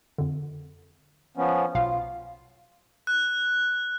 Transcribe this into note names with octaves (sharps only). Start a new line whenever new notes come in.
F2 D3
F3 B3 C#4
B1 B2 F4 F5
F#6